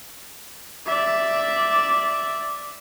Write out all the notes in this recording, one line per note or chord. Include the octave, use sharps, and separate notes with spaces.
D5 E5